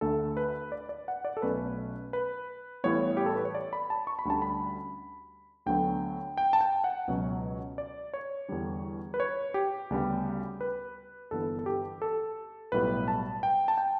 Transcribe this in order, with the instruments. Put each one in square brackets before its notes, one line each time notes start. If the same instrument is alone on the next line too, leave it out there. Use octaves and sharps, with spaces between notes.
[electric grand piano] D2 D3 A3 A4
B4
D5
D5
F#5
D5
A4
B1 B2 A3 C#4 B4
B4
A1 A2 E3 G3 B3 C#5
G4
A4
B4
C#5
D5
B5
A5
C#6
B5
D2 D3 G3 C#4 A5
B5
D2 D3 F#3 B3 G5
G5
A5
G5
F#5
C#2 B2 F#3 C#4
D5
C#5
E2 D3 G3 D4
B4
C#5
G4
D2 C#3 G3 B3
B4
G1 G2 E3 B3 A4
A4
G4
A4
B1 A2 G3 B3 B4
A5
G5
A5
G5